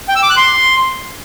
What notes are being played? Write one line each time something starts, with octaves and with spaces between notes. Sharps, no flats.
G5
E6
D6
F#6
C6